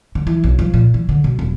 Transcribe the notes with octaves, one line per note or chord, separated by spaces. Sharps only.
D3
E3
B1
F3
A#2
E3
D3
B2
E1